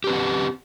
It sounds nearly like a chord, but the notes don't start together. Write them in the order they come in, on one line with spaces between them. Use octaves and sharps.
G4 B4 C4 F#5